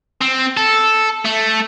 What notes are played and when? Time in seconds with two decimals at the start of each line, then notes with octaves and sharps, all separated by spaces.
0.22 C4
0.57 A4
1.25 A3